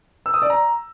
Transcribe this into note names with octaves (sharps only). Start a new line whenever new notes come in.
E6
D#6
D5
A#5